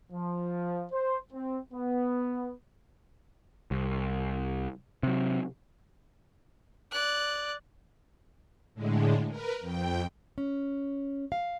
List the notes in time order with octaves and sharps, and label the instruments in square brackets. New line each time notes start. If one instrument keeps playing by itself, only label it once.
[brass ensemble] F3
C5
C4
B3
[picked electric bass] C2
C3 F#3
[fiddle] D5 F#6
[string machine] A2 D3 G#3
A#4 B4
F2 G5
[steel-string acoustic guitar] C#4
F5